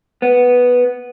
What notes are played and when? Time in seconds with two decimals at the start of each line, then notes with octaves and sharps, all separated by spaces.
0.22 B3